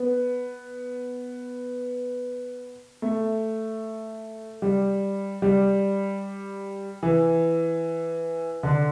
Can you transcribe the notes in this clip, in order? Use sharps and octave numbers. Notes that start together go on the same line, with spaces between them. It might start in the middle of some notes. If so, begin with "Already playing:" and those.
Already playing: B3
A3
G3
G3
E3
D3